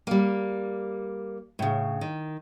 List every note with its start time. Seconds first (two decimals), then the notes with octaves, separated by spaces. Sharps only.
0.07 G3 A#3
1.59 A2 C#3
2.01 D#3